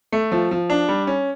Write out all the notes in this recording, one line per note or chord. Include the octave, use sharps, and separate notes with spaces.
A3
F3
F3
D4
G3
C#4